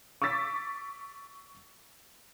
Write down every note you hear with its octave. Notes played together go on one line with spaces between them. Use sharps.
C#6 D6 E6 A6 B6